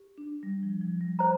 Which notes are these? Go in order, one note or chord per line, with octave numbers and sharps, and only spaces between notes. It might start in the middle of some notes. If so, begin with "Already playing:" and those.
Already playing: G4
D4
G3
F3
F3
G3
G3 C5 A#5